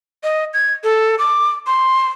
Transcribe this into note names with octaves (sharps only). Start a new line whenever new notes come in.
D#5
G#6
A4
D6
C6